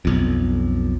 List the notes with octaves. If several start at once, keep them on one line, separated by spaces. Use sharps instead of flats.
B1 F2